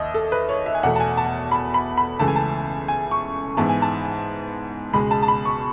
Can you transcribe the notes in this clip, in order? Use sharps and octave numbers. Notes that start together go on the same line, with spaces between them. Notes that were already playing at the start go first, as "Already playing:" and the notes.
Already playing: D#2 D#5 E5
A4
B4
C#5
E5
G#5
E2 B2 A3 F#5
A5
G#5
A5
B5
B5
B5
C#2 C#3 E3 A3 A5
G#5
A5
G#5
C#6
G#2 E3 B3 A5
G#5
A5
C#2 B2 G#3 B5
A5
A5
B5
C#6